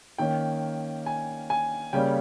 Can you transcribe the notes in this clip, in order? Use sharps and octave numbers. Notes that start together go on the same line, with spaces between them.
D#3 A#3 C#4 G5
G#5
G#5
C#3 G3 A#3 C#4 G5